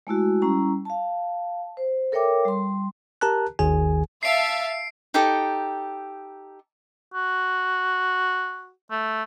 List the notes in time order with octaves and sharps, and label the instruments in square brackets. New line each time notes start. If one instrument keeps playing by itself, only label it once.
[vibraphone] G#3 A3 E4 F#4
G3 C#4 E4 A#5
F5 A5
C5
A4 A#4 C#5 E5 G5 D6
G3 C6
[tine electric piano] G4 A#4 A5 A#5 F#6
G#1 D#2 D#3 G#4 G#5
[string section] E5 F5 A5 [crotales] C7 D7
[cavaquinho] D#4 G4 A4
[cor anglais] F#4
A3